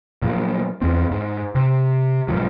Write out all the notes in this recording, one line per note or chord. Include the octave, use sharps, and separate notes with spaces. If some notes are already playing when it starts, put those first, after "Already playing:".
A#2 F3 F#3
E2 C4
G#2
C3
B1 G#2 F3 F#3